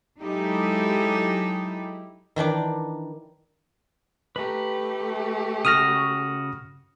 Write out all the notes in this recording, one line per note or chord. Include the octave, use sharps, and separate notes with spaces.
F#3 G#3 D#4 E4 G4 A4
D#3 E3 D4 D5
A3 G4 B4 A#5
C#3 F#4 D#6 F6 A#6